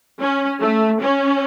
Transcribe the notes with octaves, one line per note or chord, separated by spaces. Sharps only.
C#4
A3
C#4